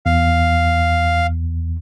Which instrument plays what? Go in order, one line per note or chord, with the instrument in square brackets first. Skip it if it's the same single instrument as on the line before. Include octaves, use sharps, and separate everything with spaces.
[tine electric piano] E2 [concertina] F5